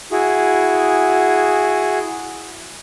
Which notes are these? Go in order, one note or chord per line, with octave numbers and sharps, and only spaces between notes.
E4 F#4 G#4